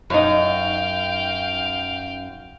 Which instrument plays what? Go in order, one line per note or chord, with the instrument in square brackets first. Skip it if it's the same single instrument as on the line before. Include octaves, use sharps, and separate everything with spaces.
[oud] F#2 D#4 [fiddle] F5 G5